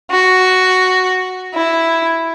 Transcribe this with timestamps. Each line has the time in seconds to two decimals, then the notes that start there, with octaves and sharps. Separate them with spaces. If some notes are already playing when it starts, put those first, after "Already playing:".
0.11 F#4
1.54 E4